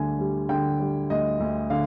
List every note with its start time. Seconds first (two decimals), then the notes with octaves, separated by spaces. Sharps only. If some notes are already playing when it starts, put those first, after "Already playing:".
Already playing: D2 D3 G3 G#5
0.19 G3
0.49 D3 G5
0.79 G3
1.10 D2 D#5
1.40 D2
1.70 D3 F5